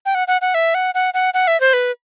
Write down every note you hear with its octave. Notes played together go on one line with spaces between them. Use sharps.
G5
F#5
F#5
F#5
E5
F#5
F#5
F#5
F#5
E5
C5
B4